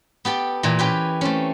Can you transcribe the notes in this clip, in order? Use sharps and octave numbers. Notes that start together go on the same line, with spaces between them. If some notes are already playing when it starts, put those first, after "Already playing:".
B3 G4 A4 G5
A#2 E3
C#4 G4 B4 G5
A3 C4 C#4